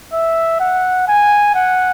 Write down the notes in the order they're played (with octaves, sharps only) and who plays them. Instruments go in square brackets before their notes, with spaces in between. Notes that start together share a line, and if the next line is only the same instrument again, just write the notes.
[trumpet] E5
F#5
G#5
F#5